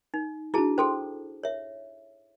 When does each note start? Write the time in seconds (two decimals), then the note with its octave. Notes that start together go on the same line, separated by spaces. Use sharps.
0.14 D#4
0.54 D4 E4 F#4 G#4 A5
0.78 G#4 A4 C5 G5 C6
1.43 C#5 E5